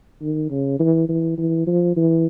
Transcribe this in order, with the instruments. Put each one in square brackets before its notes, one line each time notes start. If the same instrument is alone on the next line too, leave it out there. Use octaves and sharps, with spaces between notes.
[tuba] D#3
C#3
E3
E3
E3
F3
E3